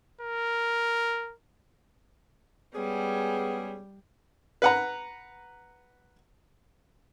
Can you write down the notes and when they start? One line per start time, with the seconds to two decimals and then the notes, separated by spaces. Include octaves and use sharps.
0.21 A#4
2.75 G3 G#3 B3 C#4 G#4
4.62 B4 F#5 A#5